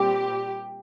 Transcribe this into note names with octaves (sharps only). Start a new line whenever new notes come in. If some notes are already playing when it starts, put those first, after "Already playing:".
Already playing: A#2 G3 C4 G4